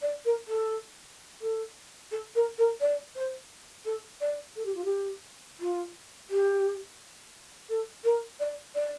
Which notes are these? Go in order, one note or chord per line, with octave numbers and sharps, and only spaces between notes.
D5
A#4
A4
A4
A4
A#4
A#4
D5
C5
A4
D5
A4
G4
F4
G4
F4
G4
A4
A#4
D5
D5